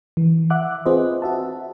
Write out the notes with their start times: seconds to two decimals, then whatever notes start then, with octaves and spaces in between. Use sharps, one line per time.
0.17 E3
0.50 E5 F#5 D6 F#6
0.86 C4 F4 G#4 B4 C5 D#5
1.22 F#4 E5 A5